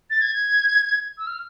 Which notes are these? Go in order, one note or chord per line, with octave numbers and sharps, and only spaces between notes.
A6
G#6
E6
F6